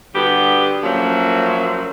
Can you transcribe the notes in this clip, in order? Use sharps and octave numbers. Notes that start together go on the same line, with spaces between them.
G2 D3 B3 F#4 G4
F3 F#3 A3 A#3 C#4